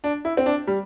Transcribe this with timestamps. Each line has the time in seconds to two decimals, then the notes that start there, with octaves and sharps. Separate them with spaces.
0.04 D4
0.25 E4
0.37 C4
0.46 D4
0.67 G3